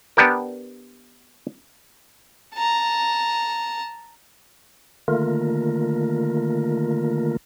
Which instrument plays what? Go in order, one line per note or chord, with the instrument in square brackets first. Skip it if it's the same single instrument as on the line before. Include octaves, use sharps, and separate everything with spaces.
[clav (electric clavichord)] B3 D4 G4 A#4
[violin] A5 A#5
[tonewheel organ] D3 D#3 A3 A#3 F4 A#4